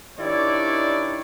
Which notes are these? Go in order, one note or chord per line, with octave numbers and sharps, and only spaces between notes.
D#3 D4 E4 G4 C#5 D5